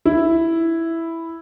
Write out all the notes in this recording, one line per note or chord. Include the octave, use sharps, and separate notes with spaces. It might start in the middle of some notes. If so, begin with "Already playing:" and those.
E4